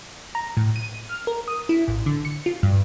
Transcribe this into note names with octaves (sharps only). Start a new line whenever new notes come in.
A#5
A2
D#7
F6
A#4
D#6
E4
A1
D3
C#7
F4
G2